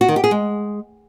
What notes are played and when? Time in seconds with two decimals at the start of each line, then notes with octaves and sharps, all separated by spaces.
0.01 F#4
0.08 D#3
0.16 G4
0.24 G#4
0.31 G#3